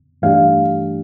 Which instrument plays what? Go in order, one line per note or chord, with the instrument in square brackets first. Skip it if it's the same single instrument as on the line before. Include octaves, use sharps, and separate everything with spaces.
[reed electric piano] G2 E3 A3 D4 G4 [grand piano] F5